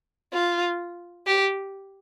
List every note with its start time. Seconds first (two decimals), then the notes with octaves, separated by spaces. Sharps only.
0.33 F4
1.26 G4